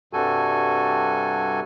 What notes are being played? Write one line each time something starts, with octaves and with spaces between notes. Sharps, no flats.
G2 C3 G3 F#4 A4 G#5